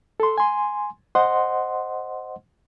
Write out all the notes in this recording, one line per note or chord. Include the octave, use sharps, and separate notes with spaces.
A4 C6
G#5 C6
C5 D#5 F#5 C6